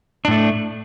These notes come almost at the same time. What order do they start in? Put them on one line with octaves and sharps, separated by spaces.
D4 A2 A3